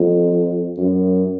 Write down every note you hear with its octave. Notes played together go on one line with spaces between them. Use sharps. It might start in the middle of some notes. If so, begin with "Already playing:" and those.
Already playing: F2
F#2